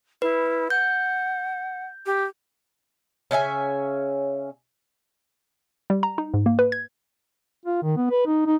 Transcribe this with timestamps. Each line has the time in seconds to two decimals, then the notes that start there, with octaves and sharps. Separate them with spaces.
0.22 E4 B4
0.70 F#5 G6
2.06 G4
3.31 C#3 C#4 E5 G#5
5.90 G3
6.03 A#5
6.18 D#4
6.34 G#2
6.46 A#3
6.59 B4
6.72 G#6
7.65 F4
7.83 D#3
7.97 B3
8.11 B4
8.26 D#4
8.46 D#4